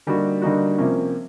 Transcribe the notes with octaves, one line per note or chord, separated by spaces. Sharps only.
D3 G3 A#3 D#4 F#4
D3 G3 A#3 D#4 F#4
C3 F3 A#3 C#4